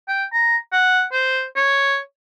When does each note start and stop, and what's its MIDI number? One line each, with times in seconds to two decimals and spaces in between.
0.09 0.24 79
0.33 0.57 82
0.72 1.04 78
1.12 1.44 72
1.56 1.98 73